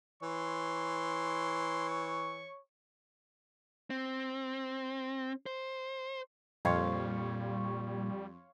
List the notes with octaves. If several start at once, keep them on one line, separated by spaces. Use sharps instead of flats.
E3 C#5 C6
C#6
C4
C5
F2 A#2 G3 C#5 F5 C6